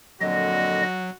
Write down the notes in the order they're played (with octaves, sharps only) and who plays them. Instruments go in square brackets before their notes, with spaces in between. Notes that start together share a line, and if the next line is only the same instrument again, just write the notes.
[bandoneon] F2 A#2 D3 [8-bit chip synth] F#3 [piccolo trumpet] F#4 [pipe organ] D#5